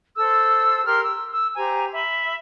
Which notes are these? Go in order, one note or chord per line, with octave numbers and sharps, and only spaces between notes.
A4 C5 E6
G4 A#4 C6 F6
E6
E6
G4 C5 G#5 A#5
E5 B5